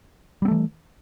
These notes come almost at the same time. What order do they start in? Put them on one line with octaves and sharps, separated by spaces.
G3 C4 A3 E3